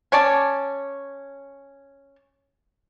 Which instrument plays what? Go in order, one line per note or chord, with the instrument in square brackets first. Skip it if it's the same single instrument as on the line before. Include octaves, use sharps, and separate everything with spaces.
[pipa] C#4 C#5 D5 A5